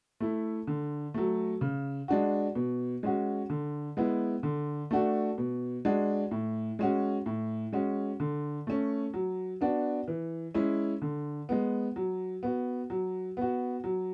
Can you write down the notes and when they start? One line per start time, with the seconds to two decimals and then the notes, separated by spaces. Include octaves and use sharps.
0.20 A3 E4
0.67 D3
1.14 F#3 A3
1.61 C#3
2.08 G#3 D4 F#4
2.55 B2
3.03 G#3 C#4 F#4
3.50 D3
3.97 G#3 B3 E4
4.43 D3
4.91 A3 D4 F#4
5.38 B2
5.85 G#3 D4 F#4
6.31 A2
6.79 G#3 C#4 F#4
7.26 A2
7.73 G#3 C#4 F#4
8.20 D3
8.67 A3 C#4
9.14 F#3
9.61 B3 D4 F#4
10.08 E3
10.54 G#3 C#4 E4
11.02 D3
11.49 G#3 B3
11.96 F#3
12.43 B3 F#4
12.90 F#3
13.37 B3 F#4
13.84 F#3